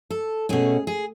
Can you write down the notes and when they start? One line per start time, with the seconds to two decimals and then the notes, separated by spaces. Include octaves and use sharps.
0.10 A4
0.49 B2 A3 C#4 G#4
0.87 G#4